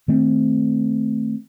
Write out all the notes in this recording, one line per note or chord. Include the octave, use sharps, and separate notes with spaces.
D#3 A3 C4